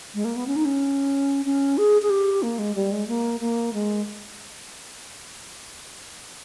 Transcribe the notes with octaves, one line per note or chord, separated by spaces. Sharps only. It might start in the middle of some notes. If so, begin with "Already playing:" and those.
G#3
A#3
B3
C#4
D#4
C#4
C#4
G#4
G#4
G4
A#3
G#3
G3
G#3
A#3
A#3
G#3